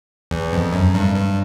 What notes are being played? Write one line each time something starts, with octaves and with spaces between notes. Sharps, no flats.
E2
F2
F#2
G2
G2